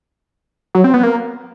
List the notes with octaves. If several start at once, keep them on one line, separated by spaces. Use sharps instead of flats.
F#3
C4
B3
A#3